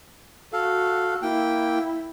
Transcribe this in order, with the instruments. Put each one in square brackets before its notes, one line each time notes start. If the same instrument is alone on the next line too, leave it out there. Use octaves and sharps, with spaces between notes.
[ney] F#4 [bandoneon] A4 F5
[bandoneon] A#3 G5 [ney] E4